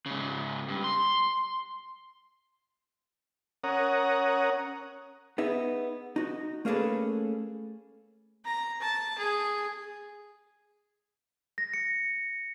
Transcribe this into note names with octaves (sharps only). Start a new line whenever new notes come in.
G#2 C#3
G2
C6
C#4 A#4 C#5 F#5 A#5 D#6
B3 D#4 G#4 E5
D#4 F#4
A3 A#3 C#4 G#4 A4 B4
A#5
A5
G#4
A#6
C#7